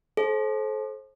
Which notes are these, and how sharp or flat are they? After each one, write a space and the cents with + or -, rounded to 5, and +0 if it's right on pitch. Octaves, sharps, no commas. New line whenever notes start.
A4 -35 C5 +30